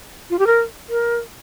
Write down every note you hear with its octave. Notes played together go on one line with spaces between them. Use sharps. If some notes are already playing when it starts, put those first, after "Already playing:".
F4
G4
A#4
A#4